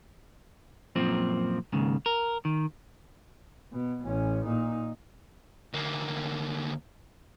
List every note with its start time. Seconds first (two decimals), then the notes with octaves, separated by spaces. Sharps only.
0.96 F#2 A#2 F3 C4
1.73 D#2 G#2 C#3
2.06 A#4
2.45 D#3
3.73 B2
4.04 A1 C#4
4.44 A#2 D#4
5.74 D2 A#3